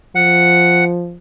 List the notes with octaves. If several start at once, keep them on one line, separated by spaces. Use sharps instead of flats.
F3 F#5